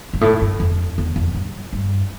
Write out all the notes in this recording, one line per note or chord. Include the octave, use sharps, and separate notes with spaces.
G2
A2
G2
F2
E2
F2
G2
G2